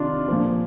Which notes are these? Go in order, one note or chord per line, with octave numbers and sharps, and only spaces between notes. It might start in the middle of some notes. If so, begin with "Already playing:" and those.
Already playing: C3 D#3 D4 D#4 F4
A#2 F3